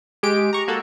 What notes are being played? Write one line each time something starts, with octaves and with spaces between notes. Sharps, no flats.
G#3 G4 D7
A#5 C#6
A#3 F#4 A4